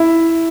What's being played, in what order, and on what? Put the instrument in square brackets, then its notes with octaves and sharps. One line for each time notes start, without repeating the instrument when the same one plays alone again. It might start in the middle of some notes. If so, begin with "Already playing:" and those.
Already playing: [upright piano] E4